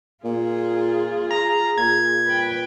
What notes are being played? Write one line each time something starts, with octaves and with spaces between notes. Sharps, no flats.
A#2 F4 G#4
A#5
A#2 G#6
B4 G5